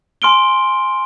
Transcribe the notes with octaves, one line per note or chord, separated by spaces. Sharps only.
G#5 C6 F6 D7 G7